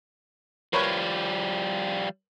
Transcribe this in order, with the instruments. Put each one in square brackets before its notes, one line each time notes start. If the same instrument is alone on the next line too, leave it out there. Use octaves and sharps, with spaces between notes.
[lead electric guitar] F3 G3 [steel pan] A#4 B4 C#5